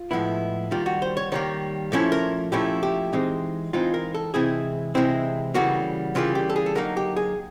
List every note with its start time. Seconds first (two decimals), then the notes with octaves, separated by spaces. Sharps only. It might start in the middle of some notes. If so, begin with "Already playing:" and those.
Already playing: F4
0.11 A2 F3 G#3 B3 E4
0.71 D#3 G3 A#3 F4
0.86 F#4
1.02 C5
1.17 C#5
1.32 D#3 G3 A#3 C#5
1.92 A#2 F3 A3 C#4 E4
2.12 A#4
2.52 A#2 F3 A3 C#4 E4 G4
2.83 G4
3.13 E3 G#3 C4 D#4
3.73 E3 G#3 C4 D#4 F4
3.94 A#4
4.14 A4
4.34 C3 E3 G#3 C4 E4 G#4
4.95 C3 E3 G#3 C4 E4
5.54 C#3 E3 G3 A#3 F#4
6.15 C#3 E3 G3 A#3 F4
6.35 G4
6.49 A4
6.56 G#4
6.66 A4
6.75 D3 F#3 A#3 D#4 A#4
6.97 G4
7.16 G#4